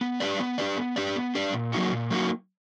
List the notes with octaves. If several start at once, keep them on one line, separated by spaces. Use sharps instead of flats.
B3
D4 G4 B4 D5
B3
D4 G4 B4 D5
B3
D4 G4 B4 D5
B3
D4 G4 B4 D5
A#2
F#3 A#3 D#4 F#4
A#2
F#3 A#3 D#4 F#4